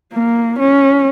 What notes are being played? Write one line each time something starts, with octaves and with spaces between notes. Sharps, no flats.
A#3
C#4